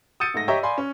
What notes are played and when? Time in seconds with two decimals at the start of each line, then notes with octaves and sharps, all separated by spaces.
0.20 D#6 E6 G6 A6 C#7 D#7
0.34 G#2 A3 A#6
0.48 G4 C#5 D#5 E5 G5 A#5
0.63 D5 F5 G#5 B5 C6
0.78 C#4